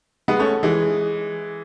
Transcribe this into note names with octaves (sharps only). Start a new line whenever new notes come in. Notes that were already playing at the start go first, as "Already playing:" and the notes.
G#3 B3
A3 C#4
E3 G#3